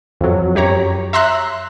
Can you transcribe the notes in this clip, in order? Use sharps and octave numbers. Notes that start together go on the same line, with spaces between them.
F2 F#3
F#2 G4 C#5 A#5
E5 A#5 C6 E6 F#6